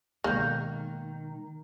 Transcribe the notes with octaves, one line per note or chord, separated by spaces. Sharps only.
B2 D#3 G#3 A#3 F#6 G6